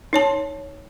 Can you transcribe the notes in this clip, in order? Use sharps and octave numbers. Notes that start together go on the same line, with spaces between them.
D#4 C#5 A5